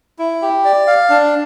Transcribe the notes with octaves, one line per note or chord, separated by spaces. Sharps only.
E4
G4
D5
F5
D4